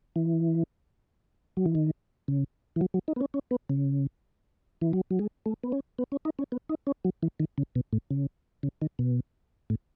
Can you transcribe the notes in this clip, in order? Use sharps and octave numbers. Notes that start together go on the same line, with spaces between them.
E3
F#3
E3
D#3
C#3
E3
F#3
F#3
D#4
B3
C#4
C#4
B3
C#3
E3
F#3
F#3
G#3
A3
B3
C#4
B3
C#4
D#4
C#4
B3
D#4
C#4
F#3
E3
D#3
C#3
B2
A2
C#3
C#3
D#3
B2
A2